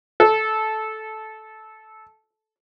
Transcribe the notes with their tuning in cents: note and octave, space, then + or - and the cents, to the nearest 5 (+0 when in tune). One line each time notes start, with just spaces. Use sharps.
A4 -15